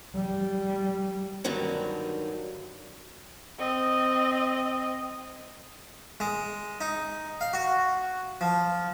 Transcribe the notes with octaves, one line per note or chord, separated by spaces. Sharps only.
G3
G2 D3 D#3 F#3 G3
C4 D#5
G#3
D#4
F5
F#4
F3